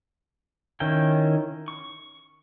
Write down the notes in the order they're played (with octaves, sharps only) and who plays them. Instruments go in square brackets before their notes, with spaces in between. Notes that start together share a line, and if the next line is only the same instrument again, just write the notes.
[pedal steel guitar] D#3 C#4 E4 G5
C#6